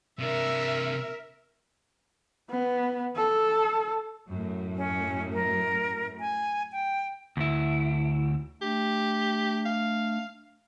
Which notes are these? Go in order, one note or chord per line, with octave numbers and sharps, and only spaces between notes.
C3 D4 A#4 E5
B3
A4
F#2 A2
C#4
A#4
G#5
G5
D2 E4
A3 D4 G4
F5